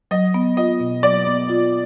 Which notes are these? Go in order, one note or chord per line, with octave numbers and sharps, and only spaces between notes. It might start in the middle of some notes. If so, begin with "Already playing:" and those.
F#3 D#5
B3
F4 D#5
B2
F#3 D5
B3
F4